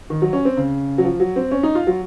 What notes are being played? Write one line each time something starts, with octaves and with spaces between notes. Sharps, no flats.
D#3
F#3
C#4
C4
C#3
F#3
F3
F#3
C4
C#4
D#4
F4
F#3